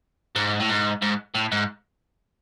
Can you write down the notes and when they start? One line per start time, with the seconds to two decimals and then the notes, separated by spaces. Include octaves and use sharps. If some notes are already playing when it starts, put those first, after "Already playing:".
0.35 G#2
0.60 A2
0.69 G#2
1.02 G#2
1.34 A2
1.52 G#2